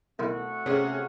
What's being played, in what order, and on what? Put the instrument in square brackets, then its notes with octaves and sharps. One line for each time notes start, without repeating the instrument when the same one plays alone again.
[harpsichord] B1 D#3 E4 [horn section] A3 C4 F#4
[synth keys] C3 [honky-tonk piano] C#4 G#4